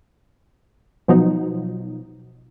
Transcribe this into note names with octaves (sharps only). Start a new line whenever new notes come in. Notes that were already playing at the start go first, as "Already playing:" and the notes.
B2 F3 F#3 D#4